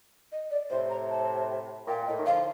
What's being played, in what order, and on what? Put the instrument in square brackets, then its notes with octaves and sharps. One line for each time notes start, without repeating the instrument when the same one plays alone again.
[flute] D#5
D5
[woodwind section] A2 C3 [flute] C5
[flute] A#5
A5
[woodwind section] A#2 [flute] G5
[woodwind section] A2 [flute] D#5
[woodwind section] D#3
[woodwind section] D3 F3 [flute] F5